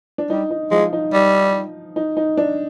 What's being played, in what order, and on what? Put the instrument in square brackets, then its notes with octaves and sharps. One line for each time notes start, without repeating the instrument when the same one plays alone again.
[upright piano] D4
[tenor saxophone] G3 [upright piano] D#4
[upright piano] D#4
[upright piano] F3 F4 [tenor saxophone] G#3
[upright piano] D#4
[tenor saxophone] G3
[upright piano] D#4
D#4
D4